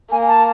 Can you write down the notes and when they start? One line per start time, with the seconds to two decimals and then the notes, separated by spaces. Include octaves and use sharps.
0.12 A#3 G#5
0.28 A5